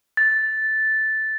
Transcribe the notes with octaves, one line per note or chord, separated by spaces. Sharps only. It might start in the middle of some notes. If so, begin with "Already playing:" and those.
A6